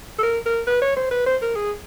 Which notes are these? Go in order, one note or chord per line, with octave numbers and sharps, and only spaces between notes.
A4
A#4
A#4
B4
C#5
C5
B4
C5
A#4
G#4